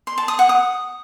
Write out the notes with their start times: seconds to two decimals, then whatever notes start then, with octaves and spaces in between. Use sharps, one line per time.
0.07 C6
0.18 A5
0.28 D#6
0.39 F#5
0.49 D#6